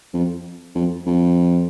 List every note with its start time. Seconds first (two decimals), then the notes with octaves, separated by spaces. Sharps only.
0.14 F2
0.75 F2
1.06 F2